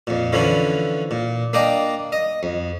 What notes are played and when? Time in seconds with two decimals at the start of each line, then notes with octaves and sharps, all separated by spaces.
0.07 F2 A#2
0.33 D3 E3 F3 C#4 E4
1.11 A#2
1.53 A#3 D4 D#5 G5
2.12 D#5
2.43 F2